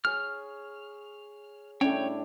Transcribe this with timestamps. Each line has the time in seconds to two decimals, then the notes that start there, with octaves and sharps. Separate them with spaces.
0.05 G#4 C#5 F6
1.81 A2 G3 C#4 D4 C#5 G5